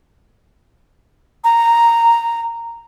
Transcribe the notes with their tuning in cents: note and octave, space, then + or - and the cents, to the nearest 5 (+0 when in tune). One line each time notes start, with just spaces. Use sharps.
A#5 -5